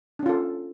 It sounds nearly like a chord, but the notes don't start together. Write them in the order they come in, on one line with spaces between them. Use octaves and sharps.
D4 C#4 F4 A4